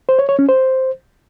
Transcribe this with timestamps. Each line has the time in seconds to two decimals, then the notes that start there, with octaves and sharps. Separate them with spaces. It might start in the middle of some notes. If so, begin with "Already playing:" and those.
0.09 C5
0.19 C#5
0.29 C#5
0.39 C#4
0.49 C5